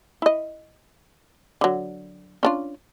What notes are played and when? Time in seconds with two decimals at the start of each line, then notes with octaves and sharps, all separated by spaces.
0.22 E4 D#5
1.61 D3 F#3
2.43 C#4 D4 F4